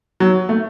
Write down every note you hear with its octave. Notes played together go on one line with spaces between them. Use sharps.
F#3
A3